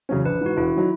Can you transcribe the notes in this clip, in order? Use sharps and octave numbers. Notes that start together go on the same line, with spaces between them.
E2 C#3 F#3 C#4
A#1 B4
G#2 E3 F#4
E1 E4
D#3 F#3